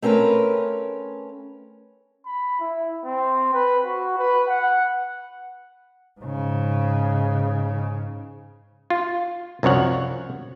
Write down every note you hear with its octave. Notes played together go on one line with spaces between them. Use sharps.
A3 C4 C#4 A#4 B4
B5
E4
C4
B4
F#4
B4
F#5
G#2 C#3
F4
C2 F#2 F3 C#5 F#5